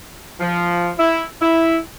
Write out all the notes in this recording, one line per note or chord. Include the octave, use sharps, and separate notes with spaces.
F3
E4
E4